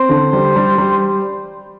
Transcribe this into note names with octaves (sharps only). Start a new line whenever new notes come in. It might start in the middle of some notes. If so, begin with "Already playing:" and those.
Already playing: C4 C5
D3
G3
G3
G3